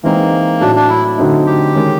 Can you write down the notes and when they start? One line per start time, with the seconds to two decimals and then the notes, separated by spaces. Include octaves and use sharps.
0.03 E3 G#3 A#3 C4 D#4
0.60 A2 F#3 A3 D4
0.76 D4
0.89 E4
1.18 D3 F#3 A3 C4 D#4
1.46 G4
1.75 D#3 G#3 C#4